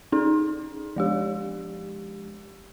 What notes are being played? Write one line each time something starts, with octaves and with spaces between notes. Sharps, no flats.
C#4 D#4 G#4
F3 G#3 G4